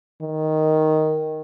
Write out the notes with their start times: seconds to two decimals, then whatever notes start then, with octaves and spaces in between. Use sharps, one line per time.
0.22 D#3